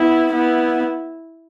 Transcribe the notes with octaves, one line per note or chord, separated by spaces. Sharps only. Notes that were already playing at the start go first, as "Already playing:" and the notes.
Already playing: B3 E4
B3 E4